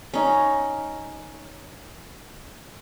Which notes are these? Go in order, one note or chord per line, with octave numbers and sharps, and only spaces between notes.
C#4 D#4